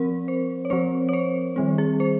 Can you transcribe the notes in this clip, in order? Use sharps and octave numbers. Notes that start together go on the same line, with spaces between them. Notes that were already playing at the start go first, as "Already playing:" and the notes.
Already playing: F3 C4 A#4
C5
C#5
F3 C4 C5
C#5
C5
D#3 G3 C4
G#4
C5